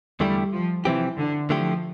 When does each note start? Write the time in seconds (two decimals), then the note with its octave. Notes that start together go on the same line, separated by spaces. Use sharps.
0.20 E2 D3 G3 A3 E4 G4
0.53 F3
0.85 C3 E3 F3 C4 G4
1.18 D3
1.50 D3 F3 A3 E4 G4